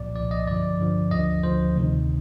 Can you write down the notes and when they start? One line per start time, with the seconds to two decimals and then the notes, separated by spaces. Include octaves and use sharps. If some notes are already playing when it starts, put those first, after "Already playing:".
Already playing: C2 A#2 F3 D5
0.15 C2 A#2 F3 D5
0.31 D#5
0.47 G2 D3 F3 D5
0.79 G2 D3 F3
1.11 D2 D3 F3 D#5
1.43 D2 D3 F3 C5
1.76 D2 C3 D#3